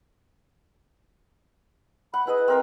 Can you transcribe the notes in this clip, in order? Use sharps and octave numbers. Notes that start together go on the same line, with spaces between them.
F#5 B5
E4 G#4 B4 D#5
C4 A#4 C5